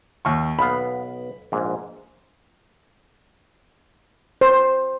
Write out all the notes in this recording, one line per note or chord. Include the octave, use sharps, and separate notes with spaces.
D#2 C#6
B1 B3 F5 B5
A#1 G#2
C5